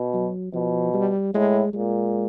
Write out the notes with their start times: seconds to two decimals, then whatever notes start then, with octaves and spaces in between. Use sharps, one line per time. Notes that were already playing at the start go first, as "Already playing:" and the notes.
Already playing: B2
0.14 F#3
0.53 B2 F3
0.94 G3
1.34 A2 G#3
1.73 A#2 G#3